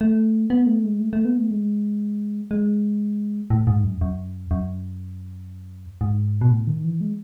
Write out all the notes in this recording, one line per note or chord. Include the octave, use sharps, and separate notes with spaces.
A3
B3
A3
G#3
A3
A3
B3
A3
G#3
G#3
A2
G#2
F#2
F#2
F#2
G#2
B2
A2
D#3
E3
G#3